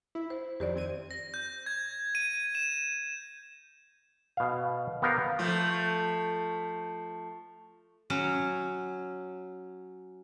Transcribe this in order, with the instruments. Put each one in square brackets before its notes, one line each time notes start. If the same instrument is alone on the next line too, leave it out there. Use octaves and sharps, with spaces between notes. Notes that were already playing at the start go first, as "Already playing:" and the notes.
[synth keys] E4
[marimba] C5
[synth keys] F2 D#3 [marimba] G4 C5 D5
[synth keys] C4 G#6 D#7
[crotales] A#6
G6
G#6
D#7
E7
[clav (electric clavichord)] B2 F5
B3 G4 A#4 F5
[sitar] F3 A3 F4
[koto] F#3 C#4